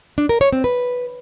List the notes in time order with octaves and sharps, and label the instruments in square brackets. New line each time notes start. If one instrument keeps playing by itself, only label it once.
[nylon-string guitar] D4
A#4
C#5
C4
B4